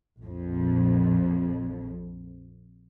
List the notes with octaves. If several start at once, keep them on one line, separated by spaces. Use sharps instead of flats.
A#1 F2